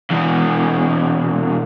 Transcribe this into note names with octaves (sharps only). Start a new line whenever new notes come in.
E2 B2